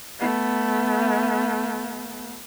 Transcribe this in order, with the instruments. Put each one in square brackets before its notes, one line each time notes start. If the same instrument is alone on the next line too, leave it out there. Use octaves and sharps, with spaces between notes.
[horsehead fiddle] A3 B3